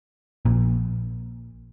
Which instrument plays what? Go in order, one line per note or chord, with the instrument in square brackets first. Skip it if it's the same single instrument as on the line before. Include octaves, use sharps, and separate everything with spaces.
[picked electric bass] A#1 A#2